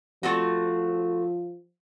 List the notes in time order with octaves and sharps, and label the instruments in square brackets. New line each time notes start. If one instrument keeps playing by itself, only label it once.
[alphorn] F3 [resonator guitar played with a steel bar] A3 C4 F#4